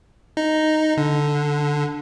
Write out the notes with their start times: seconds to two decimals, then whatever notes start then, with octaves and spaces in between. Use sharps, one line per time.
0.37 D#4
0.97 D3